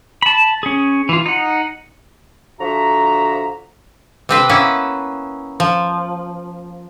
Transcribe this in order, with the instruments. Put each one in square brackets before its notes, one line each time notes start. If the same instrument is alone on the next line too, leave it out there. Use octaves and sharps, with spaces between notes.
[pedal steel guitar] A5 B5
C#4 G#4
E3 F4
D#4 F#5
[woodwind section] D3 F3 F#4 E5 A#5
[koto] C3 C4 B4 C5
A#3 B3 C#4 E4 B4
F3